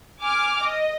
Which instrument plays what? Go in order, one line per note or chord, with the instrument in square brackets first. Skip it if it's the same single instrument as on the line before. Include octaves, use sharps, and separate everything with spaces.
[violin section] G#5 D6 F6
D#5